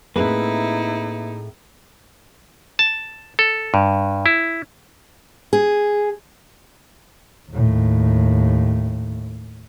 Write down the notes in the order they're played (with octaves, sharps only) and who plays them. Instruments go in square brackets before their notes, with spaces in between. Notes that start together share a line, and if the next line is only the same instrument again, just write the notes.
[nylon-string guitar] A2 C4 G#4 [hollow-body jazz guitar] A#3 B4 [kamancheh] D#4 E4
[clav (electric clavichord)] A5
A4
G2
E4
[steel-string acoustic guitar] G#4
[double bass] D#2 A2